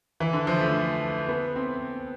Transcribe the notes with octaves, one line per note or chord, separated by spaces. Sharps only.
E3
D3
F3
A3
B3
C4